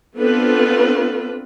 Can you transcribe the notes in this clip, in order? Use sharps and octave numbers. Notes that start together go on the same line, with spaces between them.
B3 C4 D4 F4 A4 B4